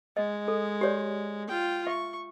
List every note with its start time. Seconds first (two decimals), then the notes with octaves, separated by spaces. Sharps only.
0.17 G#3 D#5
0.48 A4
0.81 G4 C#5 D5
1.48 F4 G5
1.87 E5 C#6